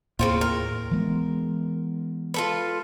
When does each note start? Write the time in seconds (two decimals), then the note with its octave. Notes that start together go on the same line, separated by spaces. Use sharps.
0.19 D#2 A2 C#3 A#3 C4 F4
0.41 A#4
0.91 E3 G#3 B3
2.34 F4 A4 B4